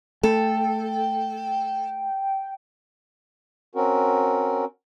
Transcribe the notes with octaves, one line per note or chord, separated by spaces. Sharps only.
A3 A4 G5
C4 C#4 F#4 A#4